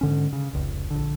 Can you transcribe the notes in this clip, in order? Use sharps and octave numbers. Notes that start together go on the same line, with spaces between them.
G#2 D3 C#4
C#3
F1 C#2
A#1 D3